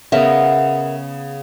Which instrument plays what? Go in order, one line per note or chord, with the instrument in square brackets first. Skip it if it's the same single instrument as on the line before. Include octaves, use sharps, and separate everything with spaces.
[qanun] C#3 B3 D#5 [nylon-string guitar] A#4 E5